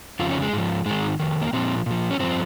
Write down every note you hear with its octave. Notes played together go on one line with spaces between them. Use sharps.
F2 C#3 F3 F4
C#4
G#3
G#2 F3
G#2 D#3 G#3
F2 D#3
A#3
A#2 F3 C4
A#2 F3
C#4
G2 F3 C4